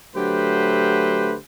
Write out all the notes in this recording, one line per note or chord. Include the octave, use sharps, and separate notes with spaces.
D3 F#3 A3 G4 B4 C5